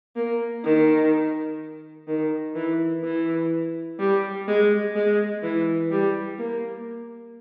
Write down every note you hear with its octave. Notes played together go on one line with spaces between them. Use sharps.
A#3
D#3
D#3
E3
E3
G3
G#3
G#3
E3
G3
A#3